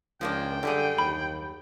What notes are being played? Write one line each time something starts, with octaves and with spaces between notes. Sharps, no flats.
C#2 F3 A#3 D4 G5
F#2 D3 G3 G#4
D#2 B5